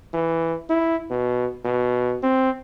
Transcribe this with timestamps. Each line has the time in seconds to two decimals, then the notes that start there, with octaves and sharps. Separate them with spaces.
0.14 E3
0.70 E4
1.11 B2
1.65 B2
2.23 C4